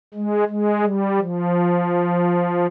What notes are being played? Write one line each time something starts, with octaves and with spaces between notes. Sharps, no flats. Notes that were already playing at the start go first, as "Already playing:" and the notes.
G#3
G#3
G3
F3